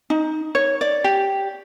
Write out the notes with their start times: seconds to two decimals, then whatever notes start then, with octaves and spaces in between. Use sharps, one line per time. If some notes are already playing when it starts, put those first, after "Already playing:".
0.10 D#4
0.55 C#5
0.81 D5
1.04 G4